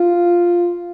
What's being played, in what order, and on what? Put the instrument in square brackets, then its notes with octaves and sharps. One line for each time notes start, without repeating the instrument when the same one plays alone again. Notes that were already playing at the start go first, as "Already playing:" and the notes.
Already playing: [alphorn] F4